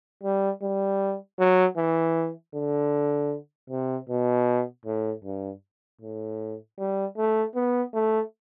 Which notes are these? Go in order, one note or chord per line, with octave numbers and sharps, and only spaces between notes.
G3
G3
F#3
E3
D3
C3
B2
A2
G2
A2
G3
A3
B3
A3